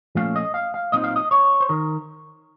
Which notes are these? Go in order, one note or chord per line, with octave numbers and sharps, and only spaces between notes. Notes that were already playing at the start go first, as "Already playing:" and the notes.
A#2 F3 A3 C#4 F5
D#5
F5
F5
A#2 F#3 C4 D#4 D#5
F5
D#5
C#5
C5
D#3 A#4